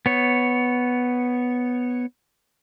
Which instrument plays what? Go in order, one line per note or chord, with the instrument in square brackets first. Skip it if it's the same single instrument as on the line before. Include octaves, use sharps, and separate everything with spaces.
[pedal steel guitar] B3 C#5